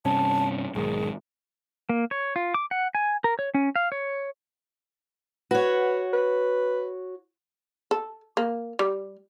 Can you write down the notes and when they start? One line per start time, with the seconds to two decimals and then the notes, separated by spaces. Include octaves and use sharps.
0.05 G2 C3 C#4 A5
0.75 B1 G#2 D#3 G#4
1.89 A#3
2.11 C#5
2.36 F4
2.54 D6
2.71 F#5
2.95 G#5
3.24 A#4
3.39 C#5
3.54 C#4
3.76 F5
3.92 C#5
5.51 F#4 B4 C#5
6.13 B4
7.91 A4
8.37 A#3
8.79 G3